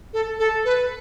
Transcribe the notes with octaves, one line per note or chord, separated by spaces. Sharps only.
A4
A4
B4